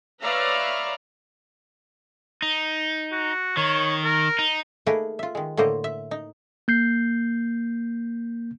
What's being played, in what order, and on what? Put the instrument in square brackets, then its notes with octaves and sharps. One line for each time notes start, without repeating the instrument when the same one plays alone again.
[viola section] B4 C#5 D5 E5 F5 A#5
[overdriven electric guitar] D#4
[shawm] F#4
[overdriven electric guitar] D#3 [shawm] C#5
[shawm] A#4
[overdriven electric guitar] D#4
[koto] A3 A#3 D#4 G#4 A#4 B4
F4 E5
D#3 G#3
A2 D3 A#3 C5 D#5
E5
D#4
[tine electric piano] A#3 G6 C7